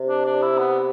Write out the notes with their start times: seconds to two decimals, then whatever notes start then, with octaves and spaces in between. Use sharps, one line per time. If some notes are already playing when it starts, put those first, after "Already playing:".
Already playing: C3
0.09 D4
0.26 D4
0.42 E4
0.58 B3